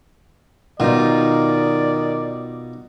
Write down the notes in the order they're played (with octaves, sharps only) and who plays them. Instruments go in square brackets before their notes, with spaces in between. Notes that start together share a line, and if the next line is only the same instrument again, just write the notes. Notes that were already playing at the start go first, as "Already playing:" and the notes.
[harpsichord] B2 [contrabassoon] D#3 [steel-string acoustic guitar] D#4 F4 [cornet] D5